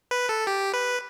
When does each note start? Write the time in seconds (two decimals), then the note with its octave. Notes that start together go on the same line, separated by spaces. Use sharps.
0.11 B4
0.29 A4
0.47 G4
0.74 B4